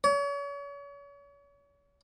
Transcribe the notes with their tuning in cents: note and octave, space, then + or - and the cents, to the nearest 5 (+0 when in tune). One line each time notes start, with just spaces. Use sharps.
C#5 +40